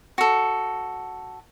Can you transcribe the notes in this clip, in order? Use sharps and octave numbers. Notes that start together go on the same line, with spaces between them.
F#4 A4